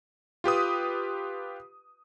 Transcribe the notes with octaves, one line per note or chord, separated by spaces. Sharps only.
F4 G4 B4 D#6